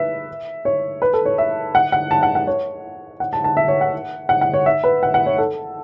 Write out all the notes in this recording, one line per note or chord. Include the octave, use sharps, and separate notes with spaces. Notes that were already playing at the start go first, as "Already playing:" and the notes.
Already playing: B4 E5
C#5
B4
A4
C#5
E5
F#5
F#5
A5
F#5
F#5
C#5
F#5
A5
A5
E5
C#5
F#5
F#5
F#5
C#5
E5
B4
F#5
F#5
C#5
A4